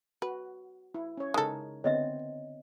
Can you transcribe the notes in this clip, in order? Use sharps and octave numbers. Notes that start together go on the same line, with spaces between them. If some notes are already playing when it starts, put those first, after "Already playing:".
F#4 B4
E4
C#4 C#5
C#3 G#3 D#4 A4 A#4
D3 B3 C4 C#5 D#5 E5